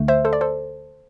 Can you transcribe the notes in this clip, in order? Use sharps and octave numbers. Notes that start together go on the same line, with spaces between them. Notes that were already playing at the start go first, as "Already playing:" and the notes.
Already playing: D2 D3 A3
C5 E5
A4 C5
D5
A4 C5